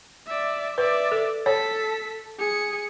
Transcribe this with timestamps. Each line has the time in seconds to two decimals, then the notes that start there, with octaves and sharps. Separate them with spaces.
0.27 D5 E5
0.78 B4 D5 E5
1.12 A4
1.46 A4 C#5 B6
2.39 G#4 C#7